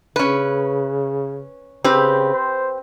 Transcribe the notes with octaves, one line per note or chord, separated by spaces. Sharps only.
C#3 C#4 B4
C#3 C4 G4 B4
C5